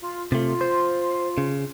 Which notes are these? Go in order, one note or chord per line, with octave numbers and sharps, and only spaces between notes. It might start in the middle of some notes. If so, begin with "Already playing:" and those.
F4
C3 A3 F4
C5
C#3